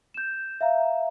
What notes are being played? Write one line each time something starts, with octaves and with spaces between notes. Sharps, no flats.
G6 E7
E5 F5 A#5